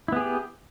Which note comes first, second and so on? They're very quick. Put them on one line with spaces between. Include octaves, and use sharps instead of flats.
E4 B3 G#4 G4